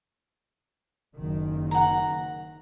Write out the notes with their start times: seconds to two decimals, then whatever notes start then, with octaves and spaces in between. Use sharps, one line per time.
1.15 F#1 D#3
1.71 F#5 A#5